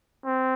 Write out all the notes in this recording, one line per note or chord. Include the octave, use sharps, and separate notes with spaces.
C4